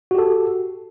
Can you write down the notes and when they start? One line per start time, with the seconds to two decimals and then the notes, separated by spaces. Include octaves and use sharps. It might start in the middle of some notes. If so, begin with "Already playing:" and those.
0.11 F#4
0.15 G4
0.18 A4